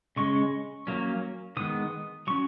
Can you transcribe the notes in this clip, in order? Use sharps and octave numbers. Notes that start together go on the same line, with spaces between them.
C#3 G#3 C#4 C#6
F#3 A#3 C#4
D#3 G#3 B3 D#6
F#3 C#4 C#6